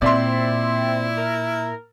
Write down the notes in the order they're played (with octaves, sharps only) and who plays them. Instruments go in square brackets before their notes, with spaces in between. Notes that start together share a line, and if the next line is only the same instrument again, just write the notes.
[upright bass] A#2 [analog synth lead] C4 [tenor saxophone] E4 [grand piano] D5 E5 C6
[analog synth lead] A#4